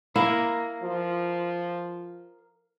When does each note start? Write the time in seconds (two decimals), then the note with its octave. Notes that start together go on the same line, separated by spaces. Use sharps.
0.16 E4 A#4 F5
0.83 F3